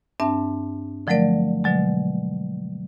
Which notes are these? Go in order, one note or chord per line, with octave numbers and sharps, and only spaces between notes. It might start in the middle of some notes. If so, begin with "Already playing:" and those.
G2 C4 D4 E5 A5
D3 F3 F#3 A3 A#4 D5
B2 D3 F#3 G#3